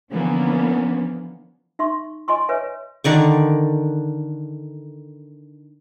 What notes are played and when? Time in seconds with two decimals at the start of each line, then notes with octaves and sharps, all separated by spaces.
0.11 D3 E3 F3 A#3 B3 C#4
1.79 D#4 E5 C6 C#6
2.28 D#5 G#5 C6 C#6
2.49 B4 C#5 E5 G#5
3.04 D3 D#3 D5 C#6